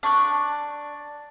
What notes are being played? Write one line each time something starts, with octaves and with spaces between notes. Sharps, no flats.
D4 C#6 F#6